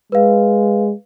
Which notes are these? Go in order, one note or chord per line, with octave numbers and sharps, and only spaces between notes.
G#3 B4 F5